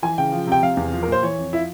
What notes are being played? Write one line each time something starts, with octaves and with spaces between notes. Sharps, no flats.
E3 G#5
C#3 G5
F3
C3 G5
C3 F5
E2
F3
A#4
A#2 C5
E3 C#5
F2
F3 E4